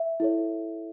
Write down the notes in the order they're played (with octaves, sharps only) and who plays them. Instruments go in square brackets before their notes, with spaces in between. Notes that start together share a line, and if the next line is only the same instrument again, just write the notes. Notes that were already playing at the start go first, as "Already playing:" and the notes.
Already playing: [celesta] E5
E4 A4 C#5